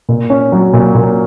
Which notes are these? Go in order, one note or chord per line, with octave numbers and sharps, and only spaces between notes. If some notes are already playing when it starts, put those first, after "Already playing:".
A#2
C#4
F#3
A#2
A#2